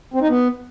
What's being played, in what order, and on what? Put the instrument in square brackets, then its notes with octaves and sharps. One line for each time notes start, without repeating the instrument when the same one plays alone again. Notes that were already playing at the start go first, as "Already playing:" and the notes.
[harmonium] C4
D#4
B3